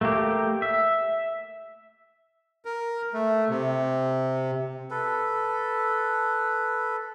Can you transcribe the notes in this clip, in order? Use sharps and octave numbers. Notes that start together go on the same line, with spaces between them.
A3 A#3 G4
E5
A#4
A3
C3
A4 B4